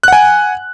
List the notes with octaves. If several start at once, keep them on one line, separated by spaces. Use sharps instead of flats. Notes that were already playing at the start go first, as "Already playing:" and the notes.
F#5 G#5 F#6